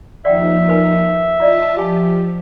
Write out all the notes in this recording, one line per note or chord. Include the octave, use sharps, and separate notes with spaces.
D#2 F3 D#4 D5 E5 F#5 G5
A#4 B4 G#5
E4 F4 D5 D#5 A5
F3 G4 F5 G#5 A5